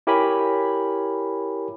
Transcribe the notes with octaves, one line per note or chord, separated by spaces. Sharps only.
E4 G4 A#4 C#5 G#5 B5